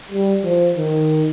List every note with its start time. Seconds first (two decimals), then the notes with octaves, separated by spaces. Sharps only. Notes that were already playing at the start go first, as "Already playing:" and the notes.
0.12 G3
0.44 F3
0.77 D#3